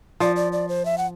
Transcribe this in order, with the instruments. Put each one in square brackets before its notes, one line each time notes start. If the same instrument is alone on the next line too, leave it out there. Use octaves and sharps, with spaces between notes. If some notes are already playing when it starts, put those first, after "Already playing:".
[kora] F3 [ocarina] D5
[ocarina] D5
D5
C5
E5
F#5